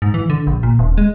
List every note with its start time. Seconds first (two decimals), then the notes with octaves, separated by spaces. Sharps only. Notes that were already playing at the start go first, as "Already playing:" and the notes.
0.02 G#2
0.14 E3
0.30 D3
0.47 A#1
0.63 A#2
0.79 D#1
0.98 G#3